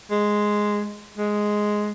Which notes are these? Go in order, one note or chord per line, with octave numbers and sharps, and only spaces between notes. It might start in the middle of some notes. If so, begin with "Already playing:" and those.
G#3
G#3